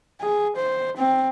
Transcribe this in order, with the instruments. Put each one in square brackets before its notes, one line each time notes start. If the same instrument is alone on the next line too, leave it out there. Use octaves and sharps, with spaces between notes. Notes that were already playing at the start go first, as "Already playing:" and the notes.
[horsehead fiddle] G#4
C5
C4